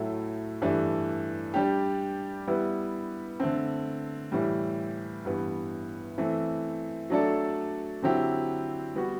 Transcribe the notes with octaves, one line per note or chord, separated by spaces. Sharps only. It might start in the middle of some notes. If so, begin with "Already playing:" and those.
Already playing: A2 F#3 A3 E4
G2 E3 A3 D4
G3 D4 G4
G3 B3 E4 B4
D3 A3 C4
A2 E3 G3
G2 E3 B3
E3 A3 C4
F#3 A3 D4 A4 D5
D3 F#3 C4 E4 G4
G3 B3 F#4